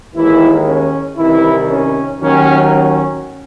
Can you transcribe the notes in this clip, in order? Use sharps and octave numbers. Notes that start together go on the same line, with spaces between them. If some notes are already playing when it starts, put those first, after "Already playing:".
D#2 D#3 E3 G#3 E4
C#4
C2 C3 D#3 E3 E4
C#4
D#2 D#3 F#3 C#4
C#4